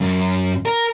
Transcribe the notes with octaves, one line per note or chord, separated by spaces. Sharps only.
F#2
A#4